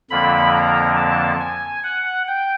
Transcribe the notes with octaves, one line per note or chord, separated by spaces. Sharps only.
F2 D3 F3 A#3 B5
A#5
A5
G#5
F#5
G5